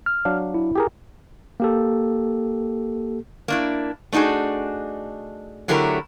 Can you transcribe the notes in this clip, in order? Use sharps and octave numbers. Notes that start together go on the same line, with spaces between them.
F6
F#3 D4 F5
E4
G4 G#4 A#4
A#3 G4 A4
A#3 D4 E4
A3 D4 D#4 F#4 G#4
D3 F#3 A3 E4 G4 A#4